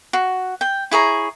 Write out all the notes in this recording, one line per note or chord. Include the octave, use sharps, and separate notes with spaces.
F#4
G5
E4 G#4 C#5 A#5